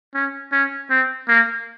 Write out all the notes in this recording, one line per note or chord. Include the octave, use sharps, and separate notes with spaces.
C#4
C#4
C4
A#3